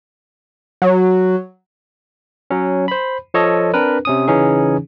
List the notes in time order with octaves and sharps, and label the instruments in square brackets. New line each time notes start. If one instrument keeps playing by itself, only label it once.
[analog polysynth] F#3
[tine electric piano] F#3 C#4
C5 B5
F3 A4 C#5 D#5
C4 D4 A#4 B4
C3 C#4 D#6
C#3 E3 C#4 D#4 G#4